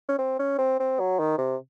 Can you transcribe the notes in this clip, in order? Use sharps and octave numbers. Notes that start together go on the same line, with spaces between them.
C#4
C4
C#4
C4
C4
F#3
D#3
C3